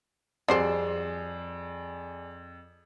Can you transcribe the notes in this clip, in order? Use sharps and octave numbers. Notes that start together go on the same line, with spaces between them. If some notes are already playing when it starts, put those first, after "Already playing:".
F2 G3 F#4 G#4 C5 D5 C7